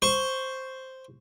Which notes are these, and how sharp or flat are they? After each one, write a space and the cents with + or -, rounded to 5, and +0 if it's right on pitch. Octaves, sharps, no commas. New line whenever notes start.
C5 +0 C#6 +0